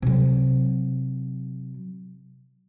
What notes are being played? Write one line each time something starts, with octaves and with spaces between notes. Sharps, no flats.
C3 F#3